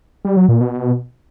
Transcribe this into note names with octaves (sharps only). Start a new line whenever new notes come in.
G3
F#3
A#2
B2
B2